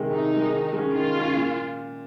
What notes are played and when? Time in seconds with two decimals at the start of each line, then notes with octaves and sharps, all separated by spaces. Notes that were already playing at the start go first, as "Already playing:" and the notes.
Already playing: C3 D#3 G#3
0.12 C3 D#4
0.33 D#3 G#3
0.53 D#3
0.73 G#3
0.78 C#4
0.94 D#3 F4
1.14 G#3 C#4
1.36 A#2